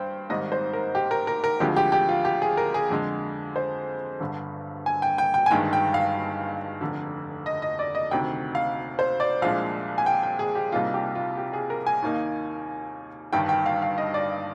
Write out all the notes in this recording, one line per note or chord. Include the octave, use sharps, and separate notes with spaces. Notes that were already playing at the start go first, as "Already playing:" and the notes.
Already playing: G2 C5 G5
G#1 G#2 D#3 G3 C4 D#5
C5
A#4
G4
A#4
A#4
A#4
D2 D3 F3 G#3 C4 G4
G4
G4
F4
G4
G#4
A#4
G#4
F2 D3 G#3
C5
G1 G2 D3
G#5
G5
G5
G5
G#5
G1 G2 D#3 G#3 G5
G5
F5
F1 F2 D3
D#5
D#5
D5
D#5
D2 C3 D#3 G5
F5
C5
D5
C2 A#2 F3 G#3 D4 F5
G#5
G5
G5
G#4
G4
C2 C3 G3 A#3 D#4 F4
G4
F4
G4
G#4
A#4
G#5
D#2 D#3 A#3 D#4
G1 G2 D#3 G5
G5
F5
F5
D#5
D5